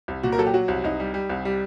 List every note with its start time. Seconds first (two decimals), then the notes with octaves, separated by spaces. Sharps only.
0.08 C2
0.23 A#2 F#4
0.32 A#4
0.38 F#3 A4
0.46 G4
0.54 F#3 F#4
0.68 C2
0.84 C2 D#4
1.00 G3
1.14 G3
1.30 C2
1.45 G3